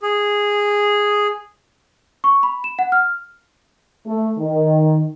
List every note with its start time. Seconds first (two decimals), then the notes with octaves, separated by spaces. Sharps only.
0.02 G#4
2.24 C#6
2.43 B5
2.64 E7
2.79 F#5
2.92 F6
4.06 A3
4.38 D#3